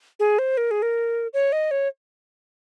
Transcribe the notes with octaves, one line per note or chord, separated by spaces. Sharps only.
G#4
C5
A#4
G#4
A#4
C#5
D#5
C#5